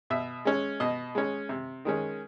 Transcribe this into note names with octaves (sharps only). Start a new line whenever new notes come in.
B2 E5
G#3 C#4
B2 D#5
G#3 C#4
C3
D#3 G#3 C#4